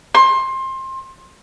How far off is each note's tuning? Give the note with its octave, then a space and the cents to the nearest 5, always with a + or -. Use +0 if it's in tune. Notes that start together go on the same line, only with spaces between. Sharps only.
C6 +25